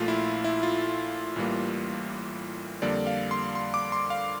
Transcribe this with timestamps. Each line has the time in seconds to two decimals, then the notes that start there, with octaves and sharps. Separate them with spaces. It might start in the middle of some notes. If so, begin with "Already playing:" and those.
Already playing: A#1 A#2 A3 F4
0.08 E4
0.44 E4
0.63 F4
1.36 A1 A2 E3 G3 A#3
2.82 F2 D3 G3 A#3 D5
3.07 F5
3.31 C6
3.55 C6
3.74 D6
3.92 C6
4.10 F5